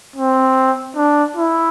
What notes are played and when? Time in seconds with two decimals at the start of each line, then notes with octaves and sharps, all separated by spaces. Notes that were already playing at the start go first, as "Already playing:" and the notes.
0.16 C4
0.96 D4
1.36 E4